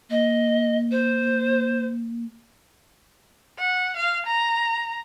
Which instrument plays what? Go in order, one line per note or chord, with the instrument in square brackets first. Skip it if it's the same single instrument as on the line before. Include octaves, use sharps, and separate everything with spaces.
[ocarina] A#3 [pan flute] D#5
[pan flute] C5
[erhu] F#5
F5
A#5